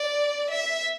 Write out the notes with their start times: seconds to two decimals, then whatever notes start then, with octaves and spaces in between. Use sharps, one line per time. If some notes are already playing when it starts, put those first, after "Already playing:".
Already playing: D5
0.50 E5